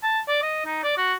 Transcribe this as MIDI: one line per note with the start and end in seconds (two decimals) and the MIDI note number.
0.03 0.20 81
0.28 0.41 74
0.43 0.64 75
0.66 0.79 63
0.83 0.97 74
0.97 1.14 66